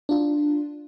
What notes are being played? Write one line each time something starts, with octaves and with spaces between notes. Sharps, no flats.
D4 F4